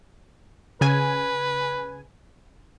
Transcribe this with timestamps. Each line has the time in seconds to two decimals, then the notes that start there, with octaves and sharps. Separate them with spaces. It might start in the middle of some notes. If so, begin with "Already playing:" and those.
0.81 C#3 B4 G#5